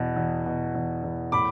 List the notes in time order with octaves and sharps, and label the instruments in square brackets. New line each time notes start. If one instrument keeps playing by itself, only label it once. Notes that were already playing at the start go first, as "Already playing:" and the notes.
Already playing: [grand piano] E2 B2
E2
B2
E2
E2
A2 B5 D6